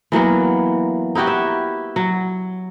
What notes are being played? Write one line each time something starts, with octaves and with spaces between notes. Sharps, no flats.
E3 F#3 A#3 B3
D#4 E4 F#4 G4
E5
F#3